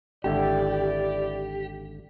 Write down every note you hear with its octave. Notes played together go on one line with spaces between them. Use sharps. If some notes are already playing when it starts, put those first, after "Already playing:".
G#1 D3 E4 G4 D5 E5